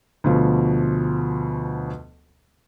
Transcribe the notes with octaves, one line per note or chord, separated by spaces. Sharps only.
D2 B2 F3